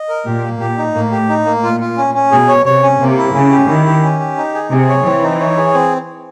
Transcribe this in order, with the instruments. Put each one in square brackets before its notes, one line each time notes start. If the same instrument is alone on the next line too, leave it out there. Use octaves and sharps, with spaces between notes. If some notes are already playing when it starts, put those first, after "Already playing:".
Already playing: [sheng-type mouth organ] D#5
A#4
[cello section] A#2 [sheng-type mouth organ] G4
[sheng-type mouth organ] A#3
[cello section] A#2 [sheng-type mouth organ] G4
[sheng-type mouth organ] D#4
[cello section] A2 [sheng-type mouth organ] A#3
[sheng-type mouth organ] G4
D#4
A#3
[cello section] A#2 [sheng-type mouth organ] F4
[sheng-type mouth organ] F4
C#4
C#4
[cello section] B2 [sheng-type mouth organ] G#4
[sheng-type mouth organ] C#5
[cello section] C3 [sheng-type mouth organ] C#5
[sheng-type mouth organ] C#4
[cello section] C3 [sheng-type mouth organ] A#3
[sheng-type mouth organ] E4
[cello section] C#3 [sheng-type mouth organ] C#4
[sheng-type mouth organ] G4
[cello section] D#3 [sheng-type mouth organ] E4
[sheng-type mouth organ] G4
C#4
G4
D#4
G#4
[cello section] C3 [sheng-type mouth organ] G#4
[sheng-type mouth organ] C#5
[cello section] E3 [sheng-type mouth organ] C4
[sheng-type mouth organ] D#4
C#5
G#4
C4